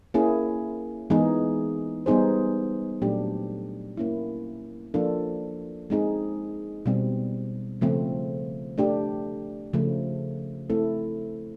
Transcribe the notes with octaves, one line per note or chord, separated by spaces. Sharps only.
A#3 C#4 E4 G#4
E3 G#3 B3 D#4 G#4
G3 B3 D#4 G#4 C5
A#2 F#3 A3 D4 G4
A#3 C#4 E4
F3 A#3 D4 F4 A4
G#3 C4 D#4 G#4
B2 G3 C4
C#3 F3 A3 C4
A3 D4 G4
C#3 F3 A3
A3 C4 E4 A4